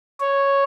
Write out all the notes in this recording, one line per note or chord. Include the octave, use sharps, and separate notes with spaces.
C#5